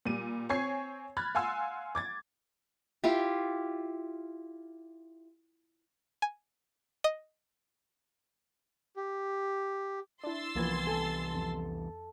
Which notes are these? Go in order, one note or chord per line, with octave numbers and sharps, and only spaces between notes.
A#2 G3 D#7
C4 C#5 G#5 C#6 G#6 C7
B5 F6 F#6 G#6 A6
F5 F#5 G#5 C6 E6
D6 G#6 A6
E4 F4 G4
G#5
D#5
G4
D4 E4 C6 E6 A6
C2 E3 F3 A#3 B3 G#6
A4 G#5
F2